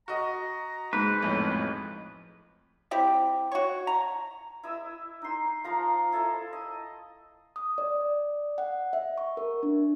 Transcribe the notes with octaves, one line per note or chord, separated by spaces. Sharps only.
F#4 D#5 A#5
G#2 B4
B1 F2 A2
C4 E4 G4
F#4 C#5
A#5
E4 D#5 E6
D#4 C6
F3 F5 A#5 C6
E4 A4 D#5
D#5
D#6
D5
F#5
E5
C#6
A#4
D4